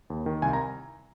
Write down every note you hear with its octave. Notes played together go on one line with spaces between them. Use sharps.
D#2
D#3
C2 G#5
A#5